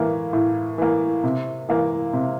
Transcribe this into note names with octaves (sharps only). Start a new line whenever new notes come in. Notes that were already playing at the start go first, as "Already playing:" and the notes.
Already playing: A2 E3 A#3
A2
E3 A#3
C3
E3 A#3
C3